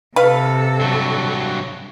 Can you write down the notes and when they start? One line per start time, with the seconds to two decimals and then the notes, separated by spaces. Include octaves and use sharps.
0.16 C3 A4 B4 F5
0.80 G2 F#3